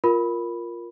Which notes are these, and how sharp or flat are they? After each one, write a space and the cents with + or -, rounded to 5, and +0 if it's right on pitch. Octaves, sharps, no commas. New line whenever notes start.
F4 +0 A#4 +5 B5 +0